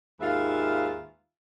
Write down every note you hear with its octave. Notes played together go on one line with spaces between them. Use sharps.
D#2 G#2 F4 B4 E5 F5